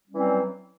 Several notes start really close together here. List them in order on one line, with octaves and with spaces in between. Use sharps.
G3 C#4 E3 F#3 C4